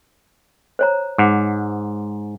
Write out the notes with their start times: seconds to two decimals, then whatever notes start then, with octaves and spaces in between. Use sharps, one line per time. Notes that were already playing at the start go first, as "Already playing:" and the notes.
0.79 C5 C#5 A#5
1.18 G#2 F#5 D6